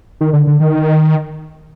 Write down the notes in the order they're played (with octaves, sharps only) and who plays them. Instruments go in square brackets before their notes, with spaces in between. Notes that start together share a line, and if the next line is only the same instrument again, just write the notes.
[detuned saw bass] D#3
D3
D3
D#3